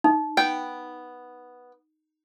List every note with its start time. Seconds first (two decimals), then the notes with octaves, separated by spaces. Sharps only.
0.04 D#4
0.37 B3 G5